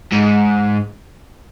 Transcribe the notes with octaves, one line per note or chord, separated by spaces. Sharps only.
G#2